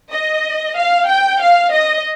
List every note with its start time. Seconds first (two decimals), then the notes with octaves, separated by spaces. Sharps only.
0.11 D#5
0.75 F5
1.08 G5
1.40 F5
1.72 D#5